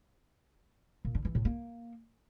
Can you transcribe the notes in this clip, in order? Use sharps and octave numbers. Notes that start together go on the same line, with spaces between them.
A#2
D3
E3
A2
A#3